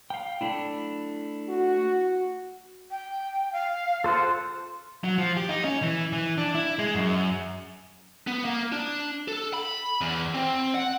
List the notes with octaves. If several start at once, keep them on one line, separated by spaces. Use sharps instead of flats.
F5 G5
A3 D4 E4
F#4
G5
F5
F4 A4 C5 F#5
F#3
F3
G4
D#4
C#4
E3
E3
D4
E4
G#3
F#2
B3
A#3
D4
A4
B5
E2
C4
F#5